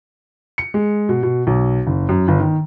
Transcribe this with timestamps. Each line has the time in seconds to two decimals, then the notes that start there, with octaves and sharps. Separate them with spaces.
0.58 C#7
0.74 G#3
1.09 B2
1.23 B2
1.47 B1
1.87 F#1
2.09 F#2
2.28 G1
2.40 D#3